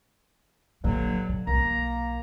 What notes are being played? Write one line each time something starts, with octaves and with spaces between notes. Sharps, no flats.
A#1 G2 A#2 D3 F#3
B2
C2 E3 A#3 A#5
B1